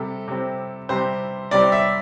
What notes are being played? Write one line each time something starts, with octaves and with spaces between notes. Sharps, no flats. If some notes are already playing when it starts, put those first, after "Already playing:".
Already playing: C3 G3 C4 A4
C3 G3 C4
C3 G3 C4 C5
C3 G3 C4 D5
E5